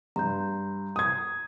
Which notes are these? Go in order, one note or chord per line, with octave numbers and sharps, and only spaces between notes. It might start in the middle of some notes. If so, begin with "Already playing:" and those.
G2 A#5 C6 G6
D#6 G#6